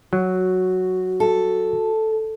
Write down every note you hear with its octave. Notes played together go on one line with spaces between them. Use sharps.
F#3 F#4
A4